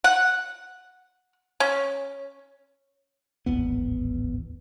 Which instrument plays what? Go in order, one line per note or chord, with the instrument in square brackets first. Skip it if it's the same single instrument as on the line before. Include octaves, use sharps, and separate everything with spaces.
[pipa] F#5
C#4
[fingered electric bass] D1 G#1 E2 B3